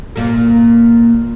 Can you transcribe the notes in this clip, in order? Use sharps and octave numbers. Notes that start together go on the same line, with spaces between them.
A#2 A#3